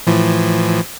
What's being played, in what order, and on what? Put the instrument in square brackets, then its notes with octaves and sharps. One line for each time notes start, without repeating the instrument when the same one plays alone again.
[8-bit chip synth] A2 E3 F3